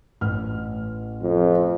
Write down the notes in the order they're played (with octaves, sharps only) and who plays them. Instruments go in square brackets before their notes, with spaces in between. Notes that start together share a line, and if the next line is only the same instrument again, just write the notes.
[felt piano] A1 F6
[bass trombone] F2